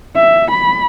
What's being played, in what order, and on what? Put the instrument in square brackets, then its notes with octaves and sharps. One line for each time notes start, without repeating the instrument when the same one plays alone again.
[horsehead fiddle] E5
B5